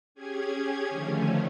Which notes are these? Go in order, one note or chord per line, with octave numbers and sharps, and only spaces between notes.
C#4 G4 G#4 G#6
D3 D#3 F3 A3 C#4